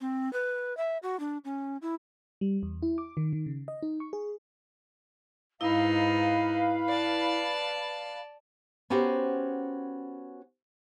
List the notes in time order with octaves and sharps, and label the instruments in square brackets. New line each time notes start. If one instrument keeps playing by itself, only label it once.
[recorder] C4
B4
E5
F#4
D4
C#4
E4
[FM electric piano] G3
E2
E4
D6
D#3
D#3
C#3
D#5
D#4
C#6
G#4
[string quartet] G#2 D#4 [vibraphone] E4 [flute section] B4 F5 B5
[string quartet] D5 A5
[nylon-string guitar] B3 C#4 F#4 G4 A#4 C5